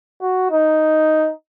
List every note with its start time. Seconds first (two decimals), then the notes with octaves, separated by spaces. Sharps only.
0.22 F#4
0.51 D#4